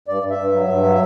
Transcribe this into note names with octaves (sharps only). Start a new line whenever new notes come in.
G2 D5
G2
E5
G2
F#3
G2
F#3